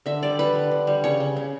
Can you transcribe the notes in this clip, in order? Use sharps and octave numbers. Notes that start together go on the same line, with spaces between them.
D3 E5
G3 D5
G3 B4
D3
D3
G3
C#3 C#5
C#3
C#3